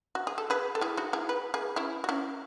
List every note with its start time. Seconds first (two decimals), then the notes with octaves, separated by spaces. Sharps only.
0.15 F#4
0.27 G#4
0.38 A4
0.50 G#4 B4
0.75 A4
0.81 E4 G#4
0.97 D#4 F#4
1.13 E4 G#4
1.29 B4
1.54 G#4 B4
1.76 C#4 E4
2.04 F#4
2.09 C#4 E4